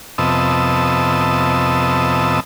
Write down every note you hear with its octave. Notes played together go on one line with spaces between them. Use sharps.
F2 C3 B3 D#5 A5 E6